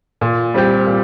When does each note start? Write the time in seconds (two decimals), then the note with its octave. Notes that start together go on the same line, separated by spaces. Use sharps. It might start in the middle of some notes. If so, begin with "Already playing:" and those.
0.21 A#2
0.54 G3 C4 G4
0.87 A#2